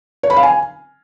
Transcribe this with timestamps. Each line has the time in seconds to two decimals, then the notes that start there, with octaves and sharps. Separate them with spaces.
0.23 C#5
0.30 B5
0.36 F5
0.43 G#5